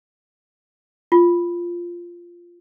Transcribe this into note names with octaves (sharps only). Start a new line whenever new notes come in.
F4